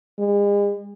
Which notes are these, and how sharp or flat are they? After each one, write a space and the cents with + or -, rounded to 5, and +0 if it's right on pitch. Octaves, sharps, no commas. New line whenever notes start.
G#3 -40